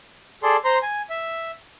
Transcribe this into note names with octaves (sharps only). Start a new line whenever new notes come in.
G#4 A4 D5 C6
C5 A#5 C6
G#5
E5